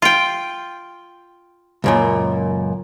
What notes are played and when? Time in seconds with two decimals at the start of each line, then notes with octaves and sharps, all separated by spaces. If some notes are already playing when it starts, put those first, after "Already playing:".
0.02 F4 G5
1.84 C#2 F#2 A#2